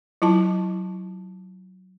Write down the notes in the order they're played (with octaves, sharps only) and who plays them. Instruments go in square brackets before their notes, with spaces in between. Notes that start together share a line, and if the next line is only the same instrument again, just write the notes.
[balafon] F#3 E4 F4 A5